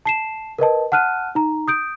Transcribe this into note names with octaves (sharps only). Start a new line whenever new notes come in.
A5 C7 E7
A#4 B4 D#5 A5
F#5 A5 F6 F#6 D#7
D#4 A#5
D#6 G6 D7